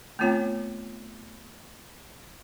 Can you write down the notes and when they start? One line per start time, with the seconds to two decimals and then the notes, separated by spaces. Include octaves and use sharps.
0.19 A3 B3 C4 F4 C#5 G5